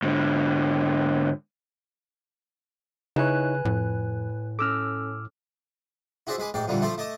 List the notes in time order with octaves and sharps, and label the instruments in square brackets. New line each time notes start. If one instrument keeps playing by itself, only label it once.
[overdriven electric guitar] G#2 D3
[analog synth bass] C#3 [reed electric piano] D#4 E4 C#5 [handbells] B4 G#5 F#6
[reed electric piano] F2 [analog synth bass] A2
[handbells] C#4 A4 [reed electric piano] D6 E6 F6
[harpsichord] E4 F#4 G#4 C5 D5 E5
G#3 B4 G#5 D6
A1 G#2 D5 G5
F2 A#2 D3 E3 G3
F3 A3 E4 A4 C5 D5
A3 D#5 A5 D6